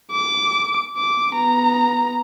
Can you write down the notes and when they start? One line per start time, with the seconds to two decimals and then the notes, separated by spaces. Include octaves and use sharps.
0.11 D6
0.97 D6
1.33 B3 A#5